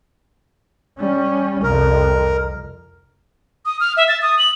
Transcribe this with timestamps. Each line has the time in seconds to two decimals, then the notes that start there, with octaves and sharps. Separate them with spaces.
0.99 G3 C#4
1.63 C2 F2 A#4
3.65 D#6
3.80 F6
3.97 E5
4.08 A6
4.22 D#6
4.39 F#7